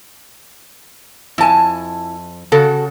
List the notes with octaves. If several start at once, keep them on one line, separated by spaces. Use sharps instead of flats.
F2 E4 G#5 A5
C#3 F#4 A4